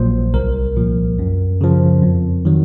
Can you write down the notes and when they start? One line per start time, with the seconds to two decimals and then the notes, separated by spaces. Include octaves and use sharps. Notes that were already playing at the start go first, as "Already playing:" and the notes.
Already playing: A#1 A#2 F#3 C5
0.34 C2 A#4
0.76 A#2 F3
1.19 F#2
1.61 C#3 F3
2.02 F2
2.45 D#3 F#3